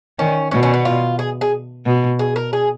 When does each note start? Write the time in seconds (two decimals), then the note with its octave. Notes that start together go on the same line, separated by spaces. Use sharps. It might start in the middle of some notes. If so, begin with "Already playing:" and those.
0.19 D#3 C#4
0.51 B2 C#4
0.63 C#4
0.74 B3
0.85 F4
1.19 G#4
1.41 G#4
1.86 B2
2.19 G#4
2.36 A#4
2.53 G#4